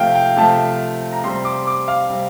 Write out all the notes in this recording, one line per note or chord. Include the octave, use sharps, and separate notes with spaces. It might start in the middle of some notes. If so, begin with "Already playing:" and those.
Already playing: C3 F3 A3 F5 G5
G5
C3 F3 A3 A5
A#5
C3 G3 C4 C6
D6
D6
F5
C3 G3 C4